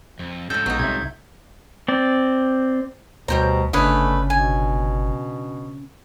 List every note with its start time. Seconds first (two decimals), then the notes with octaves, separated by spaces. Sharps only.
0.19 F2
0.50 C#2 A2 A4 E6 G6
0.66 A#1 F#3 B3 D#4
0.79 C2 C3 E5 G6 G#6
1.88 C4 D5
3.28 D2 B2 G3 C5 C#5 A#5
3.73 G1 C#3 A3 C#4 D4 B4 D#5 G#5
4.30 B2 G#5